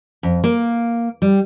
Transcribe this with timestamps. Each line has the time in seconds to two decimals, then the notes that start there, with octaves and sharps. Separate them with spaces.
0.23 F2
0.44 A#3
1.22 G3